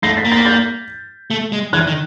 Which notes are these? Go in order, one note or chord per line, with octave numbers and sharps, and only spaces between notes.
A3 A#6 C7
A6 B6
A#3
A6 B6
G6 A6
A3
G#3
E3 F#6 G#6
D#3